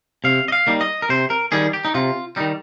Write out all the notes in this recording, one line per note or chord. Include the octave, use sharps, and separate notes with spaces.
C3 F5
D#5
F5
G3 A#3 D#4
D#5
A#4
C3 C5
A#4
D#3 G3 G#4
G4
D#4
C3 F4
D#3 G3 D#4